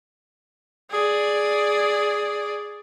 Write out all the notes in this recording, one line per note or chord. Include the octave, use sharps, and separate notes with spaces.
G#4 D5